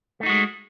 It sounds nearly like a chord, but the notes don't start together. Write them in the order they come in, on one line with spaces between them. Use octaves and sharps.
A3 D#4 F#4 G#3